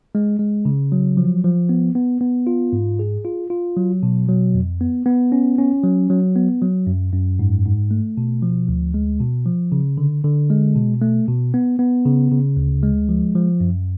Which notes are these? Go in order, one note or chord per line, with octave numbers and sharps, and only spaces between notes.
G#3
G#3
C#3
F#3
F3
F3
B3
B3
B3
F4
G#2
G#4
F4
F4
F#3
B2
F#3
F2
B3
B3
C#4
C#4
F#3
F#3
B3
F#3
F#2
F#2
G#2
G#2
A3
B2
F3
D2
G#3
B2
F3
C#3
D3
D3
G#3
B2
A3
B2
B3
B3
C#3
C#3
D2
G#3
F3
F3
F#2